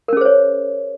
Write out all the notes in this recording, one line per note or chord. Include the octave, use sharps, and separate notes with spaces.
C#4 G#4 A#4 C5 C#5